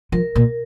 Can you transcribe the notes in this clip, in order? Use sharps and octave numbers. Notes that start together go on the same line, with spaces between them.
F3 A#4
A#2